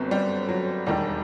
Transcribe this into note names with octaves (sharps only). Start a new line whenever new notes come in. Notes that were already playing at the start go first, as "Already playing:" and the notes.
Already playing: G1 F#2 D3 B3 C4
G3
F#3
E1 D#2 D#3 G3